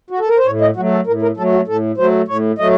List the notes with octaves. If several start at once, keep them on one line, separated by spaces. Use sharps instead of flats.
F#4
A4
A#4
C5
A2 C#5
D#5
F#3 A3 F#4
A4
A2 A#4
A#4
F#3 A3 A4
F#4
A2 A4
F#3 A3 C5
A2 C#5
F#3 A3 D#5